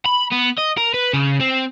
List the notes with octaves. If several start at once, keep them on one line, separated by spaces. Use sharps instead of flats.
B5
B3
D#5
A#4
B4
C#3
C4